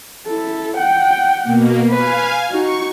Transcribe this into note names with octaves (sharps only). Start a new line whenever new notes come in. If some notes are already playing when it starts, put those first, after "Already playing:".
E4 A4
F#5 G5
B2 A#3
B4 F5 G#5
D#4 F#4 C#6